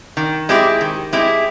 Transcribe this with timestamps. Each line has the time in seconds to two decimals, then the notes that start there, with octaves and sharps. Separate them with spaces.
0.17 D#3
0.49 G#3 C4 E4 G4
0.81 D#3
1.13 G#3 C4 E4 G4